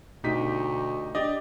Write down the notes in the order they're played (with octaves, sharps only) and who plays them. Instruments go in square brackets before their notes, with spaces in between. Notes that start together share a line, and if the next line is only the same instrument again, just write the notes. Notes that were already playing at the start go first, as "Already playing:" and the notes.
[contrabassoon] D2 [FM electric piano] B2 [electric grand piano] D#4 G4 B6
[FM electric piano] D4 [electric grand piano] G4 D5 D#5